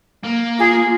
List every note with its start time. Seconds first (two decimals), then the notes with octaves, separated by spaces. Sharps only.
0.24 A#3
0.59 F4 G#4